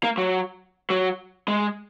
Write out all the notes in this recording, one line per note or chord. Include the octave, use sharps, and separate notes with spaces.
A#3
F#3
F#3
G#3